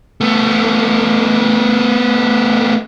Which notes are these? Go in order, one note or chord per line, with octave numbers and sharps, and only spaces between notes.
A3 B3